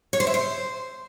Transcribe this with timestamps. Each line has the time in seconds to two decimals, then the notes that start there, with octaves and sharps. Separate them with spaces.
0.13 C#5
0.20 C5
0.27 E5
0.34 C5